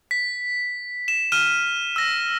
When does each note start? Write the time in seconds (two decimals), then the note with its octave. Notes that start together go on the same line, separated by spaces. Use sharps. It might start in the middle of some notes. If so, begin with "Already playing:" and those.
0.11 B6
1.08 E7
1.32 F6 D#7 E7
1.96 E6 A#6